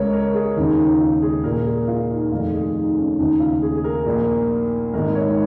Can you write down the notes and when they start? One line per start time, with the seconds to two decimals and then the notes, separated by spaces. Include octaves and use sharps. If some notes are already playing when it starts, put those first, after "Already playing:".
Already playing: C#2 C#3 A#4 C#5
0.13 A#4
0.34 G#4
0.57 D#2 C#3 D#4
0.78 D#4
1.00 F4
1.22 G#4
1.44 A#1 A#2 A#4
1.66 G#4
1.88 F4
2.09 D#4
2.31 F1 F2 D#3 F4
2.53 G#4
2.75 D#4
2.97 C#4
3.19 D#2 C#3 D#4
3.40 F4
3.62 G#4
3.76 G#4
3.84 A#4
4.06 A#1 A#2
4.93 G#1 G#2 D#3 A#4
5.15 C#5